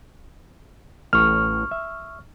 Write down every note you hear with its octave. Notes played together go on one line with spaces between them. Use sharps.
A1 A2 C#6 F6
E5